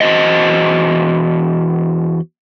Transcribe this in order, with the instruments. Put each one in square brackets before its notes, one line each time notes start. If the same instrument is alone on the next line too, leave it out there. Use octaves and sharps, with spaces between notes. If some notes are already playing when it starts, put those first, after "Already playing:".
[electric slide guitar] E2 F#4 C5 D#5